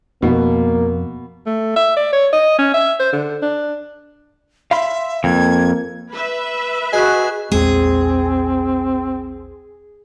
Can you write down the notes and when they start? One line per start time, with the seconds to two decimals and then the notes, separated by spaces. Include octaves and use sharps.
0.22 F2 B2 A#3
1.46 A3
1.76 E5
1.96 D5
2.13 C#5
2.33 D#5
2.59 C#4
2.74 E5
3.00 C5
3.13 D3
3.42 D4
4.71 E5 F5 B5 C6
5.24 F2 A#3 G#6
6.13 B4 E5
6.93 F#4 G#4 D#5 F#6
7.52 A#1 E2 G#3 C4 G#4